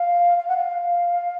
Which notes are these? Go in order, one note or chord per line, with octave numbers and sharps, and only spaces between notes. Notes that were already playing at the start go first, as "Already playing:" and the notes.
Already playing: F5
F5
F#5
F5